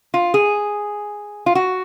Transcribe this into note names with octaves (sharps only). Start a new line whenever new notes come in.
F4
G#4
F4
F#4